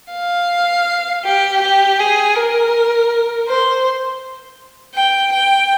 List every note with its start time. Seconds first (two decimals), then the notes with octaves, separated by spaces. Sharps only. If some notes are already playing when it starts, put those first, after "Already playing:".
0.13 F5
1.25 G4
1.62 G4
1.99 G#4
2.36 A#4
3.47 C5
4.95 G5
5.33 G5